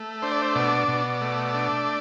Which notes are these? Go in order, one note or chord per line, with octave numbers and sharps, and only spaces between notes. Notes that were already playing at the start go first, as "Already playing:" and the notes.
Already playing: A3
D4 C5
D5
C5
B2 D5
B2
A3
D4